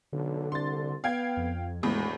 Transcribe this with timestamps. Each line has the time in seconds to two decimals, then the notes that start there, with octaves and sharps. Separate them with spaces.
0.13 B1 D3
0.52 C2 C6 A6
1.04 B3 F5 G5 G#6
1.37 F2
1.83 D#1 E2 A2 G#3